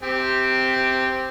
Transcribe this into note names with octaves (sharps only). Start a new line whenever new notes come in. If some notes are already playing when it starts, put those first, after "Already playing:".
C4 G4